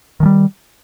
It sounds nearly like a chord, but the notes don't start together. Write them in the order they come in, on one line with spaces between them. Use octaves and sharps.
D#3 F3 G3